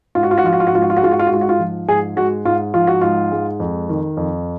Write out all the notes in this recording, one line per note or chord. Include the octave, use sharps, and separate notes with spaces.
G#2 F4
F#4
F4
F#4
F3 F4
F#4
F4
F#4
G#2 F4
F#4
F4
F#4
G#3 F4
F#4
F4
F#4
G#2 F4
F#4
F4
F3
G#2 G#4
G#3 F#4
G#2 F4
F3 F4
F#4
G#2 F4
G#3
F2
D#3
F2